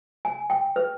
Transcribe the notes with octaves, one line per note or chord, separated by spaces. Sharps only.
G#5
G5
B4